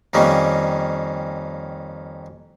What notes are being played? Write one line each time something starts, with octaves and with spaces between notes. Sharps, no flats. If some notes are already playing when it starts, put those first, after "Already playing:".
F2 D#3 G3 A#3 C#4